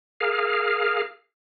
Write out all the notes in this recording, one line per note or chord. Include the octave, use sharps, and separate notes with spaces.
G#4 A#4 F5